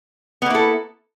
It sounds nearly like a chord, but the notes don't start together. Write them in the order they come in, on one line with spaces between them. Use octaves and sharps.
B3 A#3 E4 A4